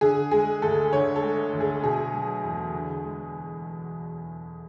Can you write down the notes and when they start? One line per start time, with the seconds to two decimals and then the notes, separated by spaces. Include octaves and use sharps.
0.01 D3 G#4
0.31 G#3 G#4
0.62 D2 A4
0.93 D3 C#5
1.16 A4
1.22 G#3
1.53 D2
1.60 G#4
1.83 B2 G#4
2.14 F#3
2.44 E2
2.74 D3
3.05 G#3